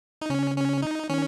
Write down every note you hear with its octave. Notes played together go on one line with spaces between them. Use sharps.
D#4
C#3 C#4
C#4
D#4
D#3 C#4